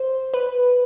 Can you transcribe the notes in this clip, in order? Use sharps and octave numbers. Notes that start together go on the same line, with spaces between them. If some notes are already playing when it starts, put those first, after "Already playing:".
Already playing: C5
B4